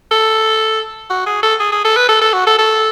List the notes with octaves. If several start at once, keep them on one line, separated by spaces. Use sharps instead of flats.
A4
F#4
G#4
A4
G#4
G#4
A4
B4
A4
A4
F#4
A4
A4